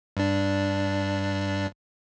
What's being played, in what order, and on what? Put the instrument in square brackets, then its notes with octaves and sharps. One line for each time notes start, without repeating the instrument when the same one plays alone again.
[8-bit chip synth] G2 D4